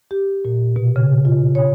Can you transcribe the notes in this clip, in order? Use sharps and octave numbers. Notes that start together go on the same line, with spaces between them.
G4
A#2
B2
C#3
F4
C#5